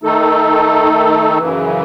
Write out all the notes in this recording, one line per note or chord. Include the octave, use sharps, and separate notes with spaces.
D#3 A3 D#4 A4
F#2 C#3 E3